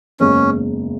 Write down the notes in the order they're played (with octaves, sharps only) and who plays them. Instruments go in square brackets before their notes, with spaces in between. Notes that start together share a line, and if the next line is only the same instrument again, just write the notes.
[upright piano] F#1 E2 C#3 G#3 [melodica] C#4